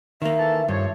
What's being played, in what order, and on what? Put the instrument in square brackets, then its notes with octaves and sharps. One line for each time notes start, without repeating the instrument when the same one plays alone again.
[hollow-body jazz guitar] D#3 A#3 [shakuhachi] E5
[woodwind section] E3 A4 A5
[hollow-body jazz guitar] G2 [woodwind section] F3 C5 C#5